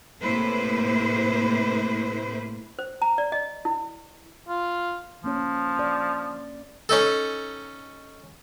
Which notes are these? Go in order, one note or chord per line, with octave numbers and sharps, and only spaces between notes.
A2 C3 A#3 E4 B4 C5
C5
A#5
D5
D#5
E4
F4
F3 A#3 C#4 C#5
D5
C#4 D#4 A4